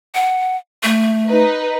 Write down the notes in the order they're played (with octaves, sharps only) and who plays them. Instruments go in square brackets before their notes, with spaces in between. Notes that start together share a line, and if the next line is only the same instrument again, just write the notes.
[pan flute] F#5
A3
[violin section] D#4 B4